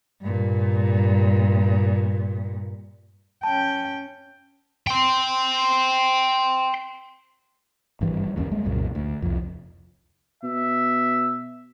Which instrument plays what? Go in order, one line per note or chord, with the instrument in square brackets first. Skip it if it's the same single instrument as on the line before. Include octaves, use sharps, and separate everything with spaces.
[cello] G2 A#2
[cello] C#4 G5 [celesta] A5
[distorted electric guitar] G5 C6
[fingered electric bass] G#1 G2 E3 G3
F#1 D#2 C#4
G3 G#3 A#3
C2 F#2 A#2 C#3
D2
C2 F2
[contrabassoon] B2 [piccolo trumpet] E5